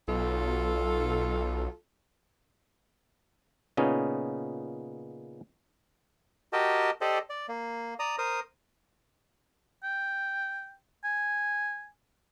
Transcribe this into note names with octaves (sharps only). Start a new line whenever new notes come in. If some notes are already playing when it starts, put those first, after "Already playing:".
B1 F4 A4
A#2 C#3 B3 C#4 D#4
F#4 G4 A#4 D#5 G5 A5
G4 A4 C5 D5 D#5
D5
A#3
D5 A#5 D#6
A#4 C5 D#6
G5
G#5